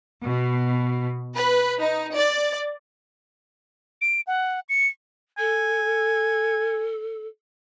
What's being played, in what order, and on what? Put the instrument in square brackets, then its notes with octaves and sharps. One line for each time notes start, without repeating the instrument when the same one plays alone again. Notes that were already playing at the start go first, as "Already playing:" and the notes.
[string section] B2
B4
D#4
D5
[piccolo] D7
F#5
C#7
[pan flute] A4 [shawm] G#5